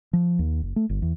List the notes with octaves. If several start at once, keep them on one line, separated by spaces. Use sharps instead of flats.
F3
D#2
F#1
A3
G1
E2